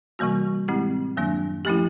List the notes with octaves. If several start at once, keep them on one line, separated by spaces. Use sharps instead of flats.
C3 E3 G3 A#3 F#4
A2 E3 G#3 C4 E4 G4
F#2 D#3 F#3 A#3 D4
F3 A3 C#4 E4 G4